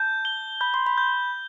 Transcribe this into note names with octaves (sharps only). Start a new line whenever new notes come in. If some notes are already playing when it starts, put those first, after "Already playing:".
Already playing: A5 G6
G7
B5 G6
C6
B5
G6